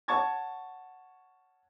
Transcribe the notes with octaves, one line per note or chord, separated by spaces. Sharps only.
C#5 F#5 A5 C#6 G#6 A6